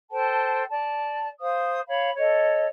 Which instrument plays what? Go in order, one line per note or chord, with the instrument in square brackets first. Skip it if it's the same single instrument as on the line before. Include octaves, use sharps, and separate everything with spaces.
[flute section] A4 C5 G5 A5
D5 A5
C5 F5 D#6
C#5 F5 B5
A4 C#5 D#5